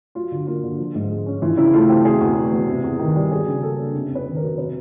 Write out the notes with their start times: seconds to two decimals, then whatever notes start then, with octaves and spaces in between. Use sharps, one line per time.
0.15 F#3 F4
0.32 D3
0.47 A#3 F4
0.63 D3
0.78 F3
0.95 G#2
1.10 G#3
1.26 C#4
1.42 E3 F4
1.57 C#3 E4
1.73 A3 F4
1.89 C4 G4
2.05 B2 G#4
2.21 E2
2.36 F#3
2.52 E2
2.68 C3
2.84 E2
2.99 D#3
3.16 G3
3.31 F#3 G#4
3.47 C#3
3.63 A#3 A4
3.79 D4
3.95 C3
4.10 F2
4.15 B4
4.26 D#3
4.36 A#4
4.42 F#3
4.58 C3 B4